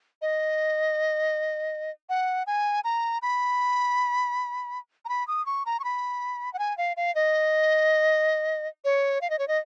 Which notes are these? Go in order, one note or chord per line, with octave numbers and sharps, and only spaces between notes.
D#5
F#5
G#5
A#5
B5
A#5
B5
D#6
C#6
A#5
C#6
B5
F#5
G#5
F5
F5
D#5
C#5
F5
D#5
C#5
D#5